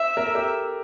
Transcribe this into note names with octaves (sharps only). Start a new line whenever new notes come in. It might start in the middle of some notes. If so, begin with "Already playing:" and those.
Already playing: C5 E5
A#4
A4
G4 A#4